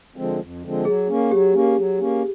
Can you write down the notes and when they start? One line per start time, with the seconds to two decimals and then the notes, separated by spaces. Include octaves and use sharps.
0.16 D3 F3 G#3 C4
0.40 F2
0.63 D3 F3 G#3 C4
0.85 F#3 G#4
1.09 A#3 C#4
1.31 F#3 G4
1.54 A#3 C#4
1.77 F#3
2.00 A#3 C#4